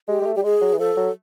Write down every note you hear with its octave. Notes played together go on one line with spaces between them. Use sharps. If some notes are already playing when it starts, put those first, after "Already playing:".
G#3 G4
G#3
A3
G3 G4
G#3 G#4
F#3
E3
F3 A4
F#3